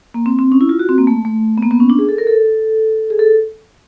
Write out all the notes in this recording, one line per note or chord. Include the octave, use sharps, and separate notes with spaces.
A#3
C4
C4
C#4
E4
F4
F#4
C4
A#3
A3
A3
B3
A#3
B3
C#4
D4
G#4
A4
A#4
A4
G#4
A4